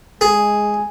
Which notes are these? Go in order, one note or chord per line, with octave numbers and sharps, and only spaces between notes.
G#3 G#4 G#5